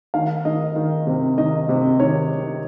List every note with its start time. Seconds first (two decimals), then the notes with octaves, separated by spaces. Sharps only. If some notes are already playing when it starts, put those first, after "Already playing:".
0.14 D#3 F5
0.45 D#3 D#5
0.76 D#3
1.07 C3
1.37 D#3 D#5
1.69 C3
2.00 D#3 C#5